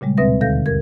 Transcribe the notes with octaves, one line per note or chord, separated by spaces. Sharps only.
A#2 C#3 G3 G#3
D2 B2 C4 B4 E5 A#6
D#2 D3 A4 F5 G6 A#6
G2 A#4 G#6